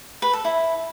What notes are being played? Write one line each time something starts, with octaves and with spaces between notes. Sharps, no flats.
B4
A4
E4